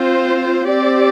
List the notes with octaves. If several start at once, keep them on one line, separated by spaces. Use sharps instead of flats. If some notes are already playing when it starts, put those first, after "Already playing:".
Already playing: C4 F4 C5
C4 G4 D5